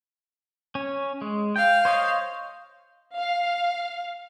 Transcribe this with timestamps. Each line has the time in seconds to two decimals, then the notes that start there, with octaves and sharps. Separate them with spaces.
0.75 C#4
1.21 G#3
1.56 F5 G5
1.85 C5 C#5 D#5
3.16 F5